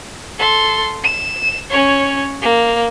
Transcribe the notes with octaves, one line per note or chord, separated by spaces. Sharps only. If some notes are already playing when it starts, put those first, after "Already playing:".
A4 C6
E7
C#4 C#5
A#3